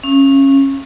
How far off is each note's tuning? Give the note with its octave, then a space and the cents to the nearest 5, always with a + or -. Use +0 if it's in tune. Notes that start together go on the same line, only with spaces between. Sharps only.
C#4 -20 F5 -40